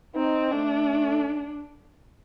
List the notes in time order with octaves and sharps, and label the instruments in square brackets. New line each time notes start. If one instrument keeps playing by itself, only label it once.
[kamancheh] C4 [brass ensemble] D#4
[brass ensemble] A3 [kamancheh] D4